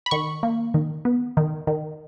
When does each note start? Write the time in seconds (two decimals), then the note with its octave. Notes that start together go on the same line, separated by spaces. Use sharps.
0.06 B5
0.11 D#3 C#6
0.43 A#3
0.74 D#3
1.05 B3
1.37 D#3
1.67 D#3